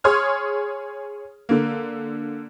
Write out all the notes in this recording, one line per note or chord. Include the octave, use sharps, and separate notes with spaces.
G#4 C#5 C6 D#6 F6 G#6
D3 A#3